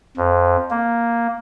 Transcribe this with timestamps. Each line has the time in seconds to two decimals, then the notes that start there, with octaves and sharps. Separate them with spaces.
0.17 F2
0.70 A#3